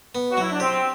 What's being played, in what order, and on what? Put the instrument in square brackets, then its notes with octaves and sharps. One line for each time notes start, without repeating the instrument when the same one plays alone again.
[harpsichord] B3
[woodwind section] F#4
[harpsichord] F#3 [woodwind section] E4
[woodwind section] D4
[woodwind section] C4 [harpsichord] G4